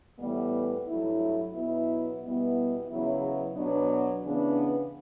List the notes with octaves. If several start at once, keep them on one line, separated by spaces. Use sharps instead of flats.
A2 E3 G3 B3
G2 F#3 A3 E4
B2 F#3 B3 E4
B2 G3 B3 E4
E2 C#3 F#3 B3 E4
B2 F#3 B3 D4
C#3 E3 B3 D4